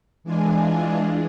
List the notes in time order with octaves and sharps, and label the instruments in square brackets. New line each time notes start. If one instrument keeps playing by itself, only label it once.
[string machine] E3 G#3 D4 F4 G#4